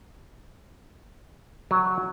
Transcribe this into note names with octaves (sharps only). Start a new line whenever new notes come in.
F#3